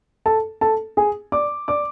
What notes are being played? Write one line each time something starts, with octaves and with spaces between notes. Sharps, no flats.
A4 A5
A4 A5
G#4 G#5
D5 D6
D5 D6